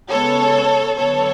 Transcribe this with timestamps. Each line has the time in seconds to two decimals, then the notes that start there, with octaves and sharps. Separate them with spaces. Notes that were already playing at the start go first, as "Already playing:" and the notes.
0.11 C#3 G#3 B3 A4 C#5
0.97 D3 F#3 B3 A4 C#5